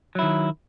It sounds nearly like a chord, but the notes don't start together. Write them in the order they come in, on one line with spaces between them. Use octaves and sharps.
F#3 E4 D#3